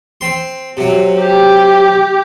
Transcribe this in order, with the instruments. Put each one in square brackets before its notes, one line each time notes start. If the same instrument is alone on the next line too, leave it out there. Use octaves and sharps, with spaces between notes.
[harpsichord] C4 C6
C3 F#3
[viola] G4